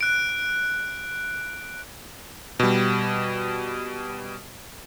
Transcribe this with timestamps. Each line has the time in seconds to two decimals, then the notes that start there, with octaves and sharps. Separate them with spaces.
0.01 F#6 D7
2.60 B2 G3